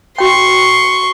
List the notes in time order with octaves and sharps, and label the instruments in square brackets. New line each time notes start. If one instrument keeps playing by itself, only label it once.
[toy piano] F#4 G5 [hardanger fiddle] C6 C#6